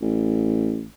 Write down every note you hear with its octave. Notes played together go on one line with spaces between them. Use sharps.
A1